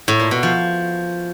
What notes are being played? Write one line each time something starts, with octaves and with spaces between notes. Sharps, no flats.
A2
A#2
B2
F3